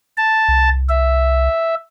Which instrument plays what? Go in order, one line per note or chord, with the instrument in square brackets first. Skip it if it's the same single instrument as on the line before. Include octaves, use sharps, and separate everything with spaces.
[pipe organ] A5
[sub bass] C2
[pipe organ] E5